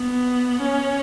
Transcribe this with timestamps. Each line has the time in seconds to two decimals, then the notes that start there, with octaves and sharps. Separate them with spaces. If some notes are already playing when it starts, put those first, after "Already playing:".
Already playing: B3
0.61 C#4